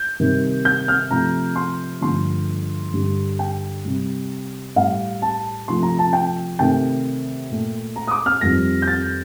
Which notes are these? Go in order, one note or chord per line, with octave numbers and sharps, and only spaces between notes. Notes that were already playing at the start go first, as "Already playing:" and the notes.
Already playing: G6
C3 D#3 G3
G6
F6
C3 F3 A3 A#5
C6
G2 D3 F3 A3 C6
G2 D3 G3
G5
C3 G3
A2 G3 F5
A5
C3 F3 A3 C6
A#5
A5
G5
C3 D#3 A3 G5
A#2 A3
A#5
D#6
D6
F6
F2 D#3 G3 A#6
G6
A6